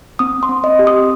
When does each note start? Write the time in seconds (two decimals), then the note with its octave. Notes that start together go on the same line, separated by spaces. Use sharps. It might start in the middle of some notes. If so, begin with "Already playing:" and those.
0.19 C4 D#6
0.43 C6
0.49 C4
0.64 D#5
0.79 G4
0.87 D#6